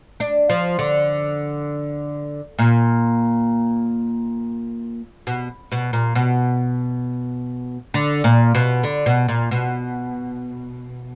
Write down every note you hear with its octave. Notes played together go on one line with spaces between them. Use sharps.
D4
F3
D3
A#2
B2
B2
A#2
B2
D3
A#2
B2
D3
B2
A#2
B2